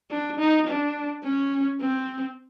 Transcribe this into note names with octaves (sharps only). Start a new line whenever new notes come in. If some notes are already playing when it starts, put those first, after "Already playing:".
D4
D#4
D4
C#4
C4